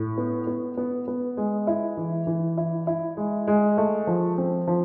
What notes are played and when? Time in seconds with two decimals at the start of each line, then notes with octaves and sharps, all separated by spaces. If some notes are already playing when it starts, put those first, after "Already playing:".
Already playing: A2
0.18 B3
0.47 B3
0.77 B3
1.08 B3
1.37 G#3
1.67 E4
1.97 E3
2.27 E3
2.58 E4
2.87 E4
3.17 G#3
3.48 G#3
3.78 A3
4.07 F3
4.38 C4
4.68 F3